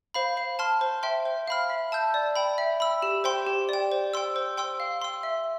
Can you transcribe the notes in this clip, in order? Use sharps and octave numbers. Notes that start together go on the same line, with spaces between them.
C5 F5 B5
F5
A5 C6 F6
C5
E5 G5 C6
C5
F5 B5 F6
E5
A5 E6 G6
D5
G5 B5
E5
B5 E6
G4
C5 G5 C6
G4
D5 G5
C5
G5 C6 E6
C5
G5 C6 E6
F5
C6 E6
E5